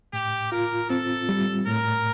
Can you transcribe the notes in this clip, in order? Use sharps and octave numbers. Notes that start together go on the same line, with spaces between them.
A2 G4
F4 A#4
C4 A4
G3
A2 A#4